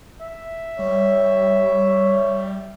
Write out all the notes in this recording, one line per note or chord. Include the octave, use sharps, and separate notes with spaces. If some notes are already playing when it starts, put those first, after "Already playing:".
E5
G3 C#5